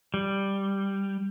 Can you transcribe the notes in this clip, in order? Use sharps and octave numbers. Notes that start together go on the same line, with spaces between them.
G3